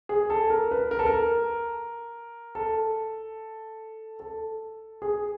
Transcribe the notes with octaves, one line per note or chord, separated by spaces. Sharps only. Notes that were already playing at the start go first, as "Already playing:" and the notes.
G#4
A4
A#4
B4
A#4
A4
A#4
A4
A4
G#4